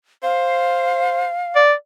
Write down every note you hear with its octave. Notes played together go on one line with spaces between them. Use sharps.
C5 F5
D5